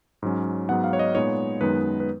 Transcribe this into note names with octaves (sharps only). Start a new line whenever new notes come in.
G#2 F#3 C#4
G#2 F#3 B3 D#4 F#5
F5
C#5
D#5
A#2 G#3 B3 D#4 C#5
F#2 D#3 G#3 B3 D#4 B4
B4